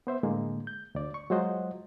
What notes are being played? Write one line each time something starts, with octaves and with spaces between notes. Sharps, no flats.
B3 C5 E5
A2 D3 G#3 A#3
G6
D2 D5
C#6
F#3 G#3 F4 C5 D#5 F#5